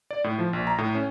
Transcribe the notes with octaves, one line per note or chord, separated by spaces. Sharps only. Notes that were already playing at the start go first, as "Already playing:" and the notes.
D5
A2
F3
A#1
A#5
A2
C#4